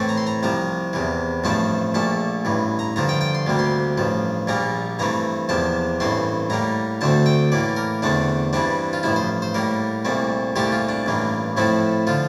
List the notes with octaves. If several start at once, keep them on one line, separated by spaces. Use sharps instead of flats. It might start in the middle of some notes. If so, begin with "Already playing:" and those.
Already playing: A2 E3 A3 C4
A#5
C6
A#5
C2 C3 F3 A#5
E2 C3 E3
A1 G2 F3 A3 C4 A5
A#1 A#2 A3 A5
A1 G2 E3
A#5
G2 D3 F3 A#5
G5
G5
C6
D2 C3 G3 A#3
C6
A1 G2 F3
A#1 A#2 G3 A#3 A#5
G2 E3 A3 C4 A#5
E2 C3 F3 A#3 A5
A1 G2 E3 A3 C4 C6
A2 G3 A#3 A#5
D2 D3 A3 C4 A5
G5
A2 E3 A#3 D5
A#4
E2 D3 A3 C4 D4
G2 E3 G3 C4 D4
F4
A1 G2 F3 E4
C5
C5
A2 G3 A#3 A#4
C2 A#2 A3 C4
C2 A#2 A3 C4 G4
F4
D4
A1 G2 E3 A#3
A2 F3 A3 C4 E4
D3 F3 F4